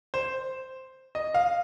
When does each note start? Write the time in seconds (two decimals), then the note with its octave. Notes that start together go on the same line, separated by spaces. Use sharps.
0.14 C5
1.15 D#5
1.34 F5